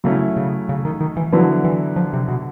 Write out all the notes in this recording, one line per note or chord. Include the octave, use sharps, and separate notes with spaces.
C#3 F#3 A3 C#4 E4
C#3
C#3
D#3
D#3
E3
D3 F3 F#3 B3 E4
E3
F3
C3
B2